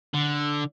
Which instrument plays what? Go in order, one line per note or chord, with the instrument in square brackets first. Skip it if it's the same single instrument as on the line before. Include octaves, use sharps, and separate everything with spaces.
[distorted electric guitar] D3